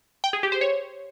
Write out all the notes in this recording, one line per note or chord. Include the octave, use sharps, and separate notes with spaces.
G5
G#4
G4
C5
C#5